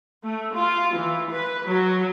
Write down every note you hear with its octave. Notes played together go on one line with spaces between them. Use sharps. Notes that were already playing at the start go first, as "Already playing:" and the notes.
A3
F4
E3
B4
F#3